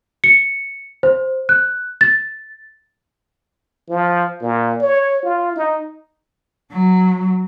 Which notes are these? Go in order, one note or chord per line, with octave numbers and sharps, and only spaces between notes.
C#7
C5
F#6
A6
F3
A#2
C#5
F4
D#4
F#3